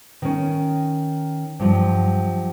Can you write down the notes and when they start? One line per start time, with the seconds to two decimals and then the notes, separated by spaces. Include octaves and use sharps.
0.22 D#3 C#4
1.60 G2 F3 F#3